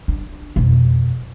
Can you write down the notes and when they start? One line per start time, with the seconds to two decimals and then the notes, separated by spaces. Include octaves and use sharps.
0.08 D4
0.56 E1 F2